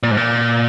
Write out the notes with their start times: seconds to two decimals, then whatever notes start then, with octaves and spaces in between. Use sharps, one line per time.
0.03 A#2
0.11 G#2
0.17 A#2